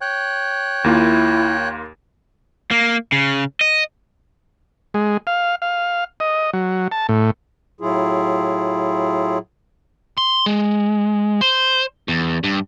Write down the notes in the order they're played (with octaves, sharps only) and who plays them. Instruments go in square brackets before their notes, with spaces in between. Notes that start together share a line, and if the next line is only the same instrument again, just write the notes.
[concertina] C#5 G5 F#6
[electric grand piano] D#2 A#3 F4 [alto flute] E4
[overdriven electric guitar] A#3
C#3
D#5
[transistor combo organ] G#3
F5
F5
D#5
F#3
A5
A2
[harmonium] A2 F#3 E4 F4 G#4
[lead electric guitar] C6
G#3
C5
E2
G2